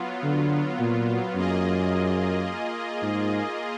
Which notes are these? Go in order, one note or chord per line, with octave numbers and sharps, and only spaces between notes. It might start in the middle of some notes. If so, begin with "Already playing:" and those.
Already playing: F#3 B3 F4
D3
A#2
F#2 A#3 F4 G#4 D#5
G#2